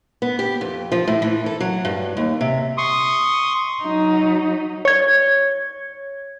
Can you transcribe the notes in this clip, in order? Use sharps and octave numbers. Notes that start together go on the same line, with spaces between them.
B3
G4
F2
F3
A2
E3
A4
F#3
G2
D#2
C3
C6 C#6 D#6
F#3 D#4
C#5 G#6